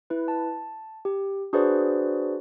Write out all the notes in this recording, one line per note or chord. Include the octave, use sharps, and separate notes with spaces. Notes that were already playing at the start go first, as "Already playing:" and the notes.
E4 B4
A5
G4
D4 F#4 G#4 B4 C5 D5